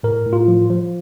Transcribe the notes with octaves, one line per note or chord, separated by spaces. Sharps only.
A2 A#4
A2
F4
F3
F3